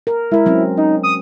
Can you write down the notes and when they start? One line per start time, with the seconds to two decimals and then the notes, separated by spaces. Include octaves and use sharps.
0.07 A#4
0.32 G#3 E4 A#4
0.46 F#3 C4 C#4
0.77 C#4 D#4
1.03 D#6